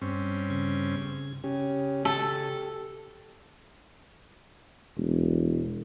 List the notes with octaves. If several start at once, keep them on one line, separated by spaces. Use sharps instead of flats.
G2 C4 C#4
C#3 G#6
C#3 C#4 G4
G4 A4
E1